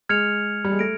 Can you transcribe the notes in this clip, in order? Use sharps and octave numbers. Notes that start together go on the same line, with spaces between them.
G#3 F6 G#6 C#7 F7
G3
G#3
A3 A#6 D7